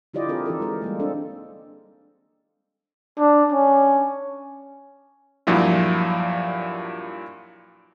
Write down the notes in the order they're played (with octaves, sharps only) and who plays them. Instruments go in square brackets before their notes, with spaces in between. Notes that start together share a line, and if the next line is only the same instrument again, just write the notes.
[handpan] D3 E4 F4 G4 D5 D#5
C4 F4 G#4 A#4
E3 D#4 G4 A4
G#3 A#4
G3 G#3 A#3
C4 D4 A4
[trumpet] D4
C#4
[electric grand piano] G2 A#2 F3 F#3 E4